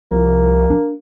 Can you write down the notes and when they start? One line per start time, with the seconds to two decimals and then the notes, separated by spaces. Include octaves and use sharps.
0.11 C2 F3 A#3
0.70 D4